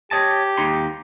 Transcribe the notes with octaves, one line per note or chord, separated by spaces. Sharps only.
G4 C#5 D#5 A5
D#2 D#4 C6